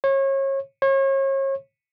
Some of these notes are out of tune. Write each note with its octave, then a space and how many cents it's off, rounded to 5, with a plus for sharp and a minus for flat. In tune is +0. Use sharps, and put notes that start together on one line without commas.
C#5 -30
C#5 -35